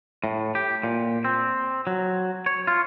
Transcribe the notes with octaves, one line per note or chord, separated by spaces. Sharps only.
A2
G4
A#2
C4
F#3
C#5
F4